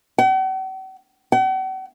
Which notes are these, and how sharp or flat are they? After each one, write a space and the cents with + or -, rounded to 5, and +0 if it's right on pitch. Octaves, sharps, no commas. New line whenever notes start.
F#5 +45
F#5 +45